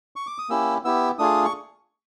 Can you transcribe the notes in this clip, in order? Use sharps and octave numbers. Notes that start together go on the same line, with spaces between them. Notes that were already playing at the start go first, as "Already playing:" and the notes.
C#6
D6
D#6
A#3 C#4 E4 G4 E6
B3 E4 G4 E6
A3 D4 F4 G#4 D#6
C#6